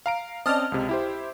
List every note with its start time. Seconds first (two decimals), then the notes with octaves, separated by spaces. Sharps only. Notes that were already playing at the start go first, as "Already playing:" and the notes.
0.06 F5 A#5 D7
0.46 C4 C#4 D5 D#5 A5 F6
0.72 C#2 C3
0.89 E4 G4 C5